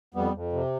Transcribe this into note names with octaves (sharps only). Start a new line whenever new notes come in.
F2 G3 B3
F2
C3